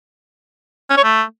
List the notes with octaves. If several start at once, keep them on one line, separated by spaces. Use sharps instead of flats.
C#4
C#5
A3